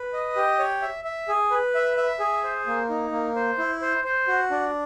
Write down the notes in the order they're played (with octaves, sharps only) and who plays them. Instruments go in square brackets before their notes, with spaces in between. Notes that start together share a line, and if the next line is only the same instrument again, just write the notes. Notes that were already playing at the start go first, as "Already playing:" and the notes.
Already playing: [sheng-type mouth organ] B4
D#5
G4
C#5
E5
E5
G#4
B4
E5
E5
G#4
C5
A#3
D#4
A#3
C5
E4
C5
C5
F#4
D4